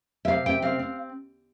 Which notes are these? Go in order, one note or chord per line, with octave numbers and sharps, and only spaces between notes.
E5
C3 F5
C3 G5
C4 F5
C4